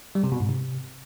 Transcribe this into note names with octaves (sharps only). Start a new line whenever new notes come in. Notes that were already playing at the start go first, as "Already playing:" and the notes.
G3
C3
B2
G#2
C3